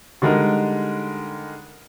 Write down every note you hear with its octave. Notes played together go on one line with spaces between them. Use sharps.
D3 G3 G#3 D#4 A#4